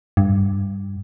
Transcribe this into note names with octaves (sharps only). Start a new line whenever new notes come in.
G2